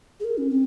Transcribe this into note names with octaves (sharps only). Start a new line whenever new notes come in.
G#4
A#4
C#4
C4